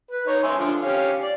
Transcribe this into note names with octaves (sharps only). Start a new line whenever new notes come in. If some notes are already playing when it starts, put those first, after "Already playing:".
B4
D#4 C#5
E5 G#5 C6
D3 F3
C#4 G4 F5
D5